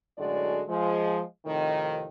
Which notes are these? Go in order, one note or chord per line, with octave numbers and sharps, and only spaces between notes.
F#2 A2 D3 G#3 F#4 D5
F3 G#3
F2 A2 C3 D#3